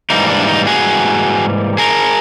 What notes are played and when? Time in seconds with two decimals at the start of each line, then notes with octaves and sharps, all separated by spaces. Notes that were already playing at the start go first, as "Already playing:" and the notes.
0.10 G#2 E3 G3 A#3 D#4
0.30 D4
0.48 D#4
0.67 F#4 G#4
1.78 G#4 A#4